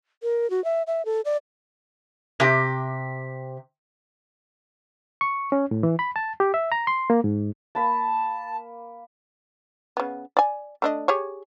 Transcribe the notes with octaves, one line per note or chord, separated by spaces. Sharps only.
A#4
F#4
E5
E5
A4
D5
C3 G4
C#6
C#4
A2
E3
B5
A5
G4
E5
A#5
C6
A#3
G#2
A#3 A5 B5
C#3 B3
D5 G#5
A3 D4 D#5
G4 G#4 C#5